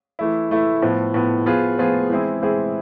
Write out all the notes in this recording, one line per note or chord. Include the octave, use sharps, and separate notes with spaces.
E3 A3 E4
E3 A3 E4
A2 F3 B3
A2 F3 B3
F3 B3 F4 G#4
F3 B3 F4 G#4
E3 G#3 C4 E4 G#4
E3 G#3 C4 E4 G#4